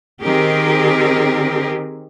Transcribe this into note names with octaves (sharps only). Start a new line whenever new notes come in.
D#3 C4 G4 G#4 A#4